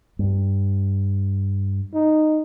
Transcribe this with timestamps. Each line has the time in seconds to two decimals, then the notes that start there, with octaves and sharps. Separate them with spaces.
0.19 G2
1.94 D#4